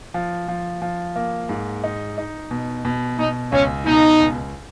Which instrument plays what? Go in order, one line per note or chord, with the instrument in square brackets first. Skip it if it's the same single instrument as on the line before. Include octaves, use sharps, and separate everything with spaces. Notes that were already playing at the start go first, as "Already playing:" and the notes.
[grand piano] F3
F3
F3
A#3
G#2
D#4
D#4
B2
B2
[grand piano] B2 [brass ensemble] D#4
[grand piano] C#2 [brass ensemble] C#4
[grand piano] B2 [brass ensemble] D#4
[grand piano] C#2